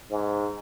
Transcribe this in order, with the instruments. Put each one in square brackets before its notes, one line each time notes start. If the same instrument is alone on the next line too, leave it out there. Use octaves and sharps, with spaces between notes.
[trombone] G#2